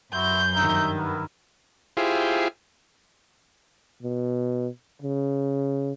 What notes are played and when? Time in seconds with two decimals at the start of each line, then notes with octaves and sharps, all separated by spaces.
0.13 F#2 E4 F#4 C6 G6
0.53 G2 D#3 D#4 E5 A#5
0.97 B3 E4 A#4
1.97 E4 F4 G4 G#4 C5
4.03 B2
5.02 C#3